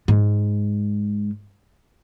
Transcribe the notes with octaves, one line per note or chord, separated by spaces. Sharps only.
G#2